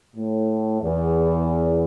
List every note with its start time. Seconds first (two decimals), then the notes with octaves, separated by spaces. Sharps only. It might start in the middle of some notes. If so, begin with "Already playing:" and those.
0.15 A2
0.81 E2